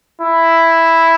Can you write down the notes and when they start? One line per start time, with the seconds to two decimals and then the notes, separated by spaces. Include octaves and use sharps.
0.21 E4